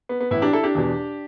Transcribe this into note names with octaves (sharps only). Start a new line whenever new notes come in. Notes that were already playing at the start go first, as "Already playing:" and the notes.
B3
B3
A2 E3 B3 E4
D4 G4
E4 A4
D4 G4
E2 B2